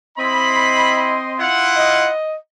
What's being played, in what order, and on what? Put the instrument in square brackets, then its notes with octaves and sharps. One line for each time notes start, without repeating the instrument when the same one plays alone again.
[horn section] C4 D#5 C6 [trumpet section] E4 B5
[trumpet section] E4 F4 F#5
[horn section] D#5